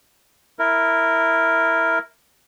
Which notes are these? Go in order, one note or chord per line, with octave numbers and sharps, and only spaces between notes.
E4 A#4